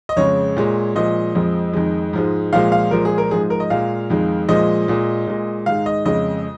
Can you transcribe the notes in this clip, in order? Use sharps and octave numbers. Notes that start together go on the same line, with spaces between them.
D#5
F2 C#3 G#3 C#5
A#2 G#3
A#2 F3 G#3 D#5
F2 F3 G#3
F2 D#3 G#3
G#2 F3 G#3
A#2 F3 G#3 F5
F5
A#2 F3 G#3 A#4
G#4
A#4
G#2 F3 G#3 G#4
A#4
D#5
A#2 G#3 F5
F2 D#3 G#3
A#2 F3 G#3 D#5
A#2 G#3
A#2 G#3
G#2 D#3 G#3 F5
D#5
F2 C#3 G#3 D#5